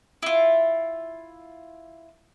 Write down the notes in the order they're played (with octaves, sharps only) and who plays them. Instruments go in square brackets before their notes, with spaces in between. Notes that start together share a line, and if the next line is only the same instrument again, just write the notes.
[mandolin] E4 F4